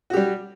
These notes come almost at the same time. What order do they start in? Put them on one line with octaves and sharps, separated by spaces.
F#4 G4 G3